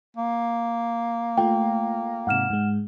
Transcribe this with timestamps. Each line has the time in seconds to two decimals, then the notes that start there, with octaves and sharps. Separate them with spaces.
0.17 A#3
1.38 A3 F4 G5
2.27 G#2 C3 F#5 F6 E7
2.50 G#2 G#3